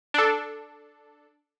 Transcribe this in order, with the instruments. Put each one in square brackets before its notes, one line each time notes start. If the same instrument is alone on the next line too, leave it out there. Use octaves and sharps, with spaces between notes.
[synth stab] D4 A4